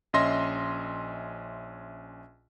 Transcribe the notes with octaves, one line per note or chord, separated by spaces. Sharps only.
A#1 C#4 D#5 E5 C6 A#6